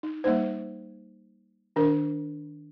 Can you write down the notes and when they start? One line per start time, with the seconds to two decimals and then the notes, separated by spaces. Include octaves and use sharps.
0.03 D#4
0.24 G3 A#3 D#4 C5
1.76 D#3 D4 A#4